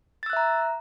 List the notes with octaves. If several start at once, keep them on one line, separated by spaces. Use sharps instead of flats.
E5 A#5 E6 F#6 A6